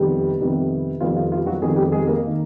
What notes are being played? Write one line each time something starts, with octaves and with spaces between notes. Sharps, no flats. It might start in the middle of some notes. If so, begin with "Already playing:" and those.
Already playing: F2 C3 D#3 G3 B3
F2 C3 D#3 G3 B3
F2 C3 D#3 G3 B3 F4
F4
F4
F#3 F#4
F2 C3 D#3 G3 G#3 B3 G#4
G3 G4
G#3 G#4
A#3 A#4
D#3